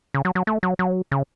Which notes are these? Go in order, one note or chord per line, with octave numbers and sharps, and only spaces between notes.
C#3
F#3
F#3
A3
F#3
F#3
C#3